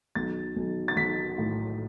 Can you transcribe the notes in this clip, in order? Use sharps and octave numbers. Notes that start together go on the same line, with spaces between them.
B1 A6
B1
A6
B1 B6
A2